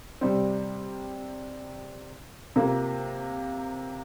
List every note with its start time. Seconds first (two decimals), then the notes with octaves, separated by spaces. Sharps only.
0.21 C3 G3 C4
2.56 C3 A#3 F4